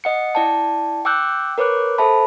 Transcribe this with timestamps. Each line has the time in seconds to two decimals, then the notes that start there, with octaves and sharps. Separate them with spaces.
0.04 D#5 F#5 C#7
0.35 E4 D5 G5 A5
1.05 G5 D6 E6 F#6 G6
1.58 A#4 B4 C#5 D6 F#6
1.98 A4 C5 E5 A5 B5